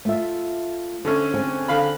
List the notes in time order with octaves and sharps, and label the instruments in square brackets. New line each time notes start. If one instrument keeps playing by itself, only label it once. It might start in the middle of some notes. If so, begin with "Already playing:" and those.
[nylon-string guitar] A3 F4 E5
[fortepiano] D3 A3 C#4 [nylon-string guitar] C5
[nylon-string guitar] C4 G#4 G#5
[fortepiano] D3 F5 B5